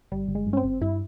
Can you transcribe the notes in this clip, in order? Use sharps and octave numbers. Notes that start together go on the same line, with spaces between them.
G1 G3
G1
G#3
G2
C#4
C4
G1
G2 E4